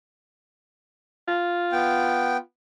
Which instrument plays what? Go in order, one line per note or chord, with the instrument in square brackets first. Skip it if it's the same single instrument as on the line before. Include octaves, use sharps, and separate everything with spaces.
[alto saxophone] F4
[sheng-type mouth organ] B3 G5